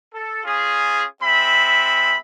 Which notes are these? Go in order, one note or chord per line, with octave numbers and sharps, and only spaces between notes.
A4
C#4 F4 G#4
G#3 C4 E5 B5